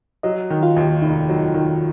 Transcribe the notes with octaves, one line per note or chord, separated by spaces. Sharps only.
F#3 D#5
D#3
F4
D#2
F1 D#4
F#3
D#3